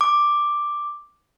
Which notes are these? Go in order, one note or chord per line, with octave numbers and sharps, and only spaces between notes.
D6